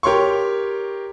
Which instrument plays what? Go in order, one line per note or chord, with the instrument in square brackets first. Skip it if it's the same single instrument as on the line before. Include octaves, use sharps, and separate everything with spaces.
[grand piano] G4 A#4 C#5 C6 C#6